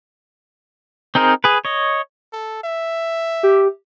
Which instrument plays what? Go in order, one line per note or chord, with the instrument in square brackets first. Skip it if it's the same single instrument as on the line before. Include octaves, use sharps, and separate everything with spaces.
[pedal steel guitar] C4 D#4 G#4 A#4 C5
G#4 B4
C#5 D#5
[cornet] A4
E5
[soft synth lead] G4